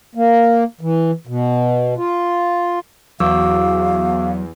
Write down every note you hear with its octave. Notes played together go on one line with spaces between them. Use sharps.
A#3
E3
B2
F4
E2 F#3 F#4 F5 D6 E6